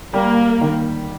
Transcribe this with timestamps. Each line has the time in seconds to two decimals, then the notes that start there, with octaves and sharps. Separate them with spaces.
0.13 G3 A#3
0.61 D#3